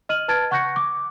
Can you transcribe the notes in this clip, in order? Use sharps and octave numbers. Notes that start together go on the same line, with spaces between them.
D#5 F6 D#7 F#7
B4 A5 F6 G#6 A6 D7
F#5 C#6 F#6 G6 A#6 C#7
D6